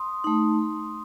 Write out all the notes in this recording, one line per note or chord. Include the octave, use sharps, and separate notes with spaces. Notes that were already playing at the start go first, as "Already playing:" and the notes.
Already playing: C6 D#6
A3 D#4